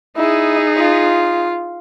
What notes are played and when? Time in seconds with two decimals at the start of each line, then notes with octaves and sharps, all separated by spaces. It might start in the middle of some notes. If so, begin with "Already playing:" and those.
0.17 D#4 E4 G#4
0.77 F4